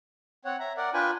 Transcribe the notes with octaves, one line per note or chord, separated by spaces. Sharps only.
C4 C#5 F#5
E5 A#5
A#4 D5 F#5
D4 F4 B4 G5 G#5